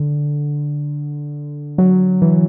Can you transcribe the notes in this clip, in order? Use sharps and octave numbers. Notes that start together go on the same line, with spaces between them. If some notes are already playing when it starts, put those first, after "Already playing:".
Already playing: D3
F#3
E3